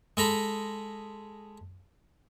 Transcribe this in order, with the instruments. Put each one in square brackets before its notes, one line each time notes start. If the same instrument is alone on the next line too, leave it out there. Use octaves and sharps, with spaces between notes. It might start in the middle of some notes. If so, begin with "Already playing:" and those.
[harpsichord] G#3 A4 A#5 B5